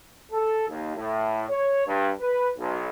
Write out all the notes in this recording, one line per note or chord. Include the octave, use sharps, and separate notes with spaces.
A4
D#2
A2
C#5
G2
B4
B1